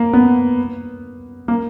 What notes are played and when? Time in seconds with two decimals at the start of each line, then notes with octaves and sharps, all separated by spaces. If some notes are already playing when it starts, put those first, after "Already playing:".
Already playing: A#3
0.13 B3
1.48 A#3